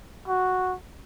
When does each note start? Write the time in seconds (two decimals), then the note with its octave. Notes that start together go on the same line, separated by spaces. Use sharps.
0.28 F#4